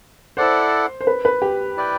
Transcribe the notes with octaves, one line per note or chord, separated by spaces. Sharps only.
E4 A4 C5 D5 F#5
C5
B4
B4
G4
E4 B4 D5 G5